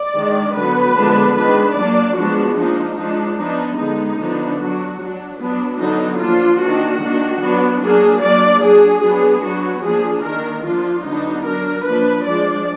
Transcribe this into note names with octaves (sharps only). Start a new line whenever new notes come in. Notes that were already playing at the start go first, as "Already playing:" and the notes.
Already playing: D5
D#3 G#3 D4
D3 F#3 B3 B4
D3 F3 G#3 B3 D4
D#3 G#3 D4 B4
F#3 A#3 D4 D5
F3 G#3 B3 D4 F#4
F3 A#3 D4 D#4
F3 G#3 D4 D#4
F3 B3 D4 D#4
D3 G#3 B3 D#4
D3 F3 B3 D4
F#3 D4 F#4
F#3 D4
F#3 B3 D4
D3 F#3 B3 D4 D#4
F3 A#3 D4 F4
D#3 A#3 D4 F#4
D#3 A#3 D4
F#3 B3 D4
F#3 A#3 D4 G#4
F#3 A#3 D4 D5
F#3 D4 G#4
F#3 B3 D4
F#3 B3 D4 F#4
F3 A#3 D4 G#4
D#3 A#3 D4 A#4
F3 A#3 D4 F4
D3 F#3 B3 D4 D#4
F#3 D4 A#4
F3 A#3 D4 B4
F3 G#3 D4 D5